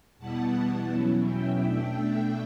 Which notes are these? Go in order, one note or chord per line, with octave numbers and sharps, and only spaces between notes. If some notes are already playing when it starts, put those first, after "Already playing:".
E2 B2 G3 B3 E4 F#5 A5
E2 B2 F#3 C#4 E4
E5 G5
B2 A3 D4